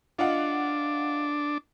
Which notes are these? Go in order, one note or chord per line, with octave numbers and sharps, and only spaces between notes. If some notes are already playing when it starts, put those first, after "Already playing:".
D4 F4 D#5 F#5